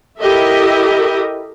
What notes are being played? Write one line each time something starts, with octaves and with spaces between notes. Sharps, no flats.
E4 G4 A4 A#4 D#5 E5